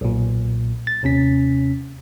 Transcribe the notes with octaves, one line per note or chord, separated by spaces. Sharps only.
B1 A#2
A6
D#2 C3 C#4 B6